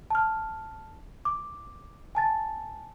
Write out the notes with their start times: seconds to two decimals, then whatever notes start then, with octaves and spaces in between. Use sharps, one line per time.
0.10 A5 F6
1.25 D6
2.15 G#5 A5 A6